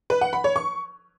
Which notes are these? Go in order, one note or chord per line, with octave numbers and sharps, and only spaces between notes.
B4
F#5
B5
C#5
C#6